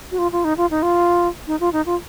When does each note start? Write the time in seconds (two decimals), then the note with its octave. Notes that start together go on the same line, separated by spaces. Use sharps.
0.11 F#4
0.18 F4
0.32 F4
0.44 D#4
0.57 F4
0.71 D#4
0.83 F4
1.47 D#4
1.60 F4
1.73 D#4
1.86 F4